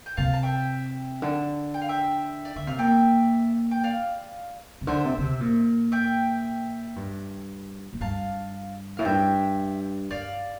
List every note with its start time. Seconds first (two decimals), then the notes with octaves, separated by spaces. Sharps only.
0.06 G5
0.17 C3 F5 A5
0.33 A5
0.43 E5 G5
1.22 D3
1.74 G5
1.81 F5
1.88 E5 G5
2.45 D5
2.56 D3 E5
2.67 C3 F5
2.78 A#2 E5 G5
3.71 G5
3.84 D5 F5
4.81 C3
4.87 D3 C5 E5
5.05 C3
5.18 D3
5.22 C3
5.41 A#2
5.92 E5 G5
6.96 G2
7.93 A2
8.01 G2 F5 A5
8.97 A2 F5
9.05 G2 E5 G5
10.10 G2 D5 F5